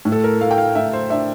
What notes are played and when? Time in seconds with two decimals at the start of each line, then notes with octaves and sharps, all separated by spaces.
0.05 A2
0.12 A4
0.24 A#4
0.41 A3 F5
0.51 G5
0.58 F5
0.75 A2 E5
0.93 C5
1.10 D4 E5